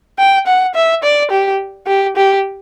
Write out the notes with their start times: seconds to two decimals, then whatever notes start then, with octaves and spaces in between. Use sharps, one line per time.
0.18 G5
0.47 F#5
0.75 E5
1.03 D5
1.31 G4
1.87 G4
2.16 G4